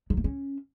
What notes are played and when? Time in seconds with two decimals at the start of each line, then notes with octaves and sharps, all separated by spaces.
0.10 F#3
0.17 A#3
0.24 C#4